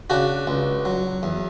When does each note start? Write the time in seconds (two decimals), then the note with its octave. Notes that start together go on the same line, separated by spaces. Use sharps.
0.10 C#3 D4 F#4
0.47 C#2
0.85 F#3
1.23 E2